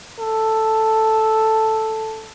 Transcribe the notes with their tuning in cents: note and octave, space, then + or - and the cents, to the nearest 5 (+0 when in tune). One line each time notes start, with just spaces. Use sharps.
A4 +0